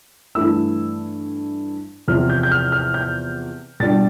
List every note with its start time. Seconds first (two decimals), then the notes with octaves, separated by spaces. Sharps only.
0.35 G2 E3 A3 E4 E6
2.08 E2 C3 F3 F6
2.30 G6
2.43 G6
2.52 F6
2.72 F6
2.94 G6
3.80 B2 G3 D4 A6